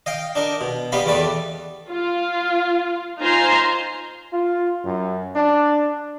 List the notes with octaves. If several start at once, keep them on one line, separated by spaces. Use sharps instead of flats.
D#5 F5 G5
D4 D#4 A#4
B2
G3 B3 D#4 F5 B5
E2 G3 A3 B4 D5
F4
D#4 F4 C5 G#5 A#5 C6
F4
F#2
D4